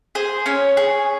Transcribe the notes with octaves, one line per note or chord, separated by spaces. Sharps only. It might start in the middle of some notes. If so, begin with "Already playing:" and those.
G#4 C5
C#4 C#5
G#4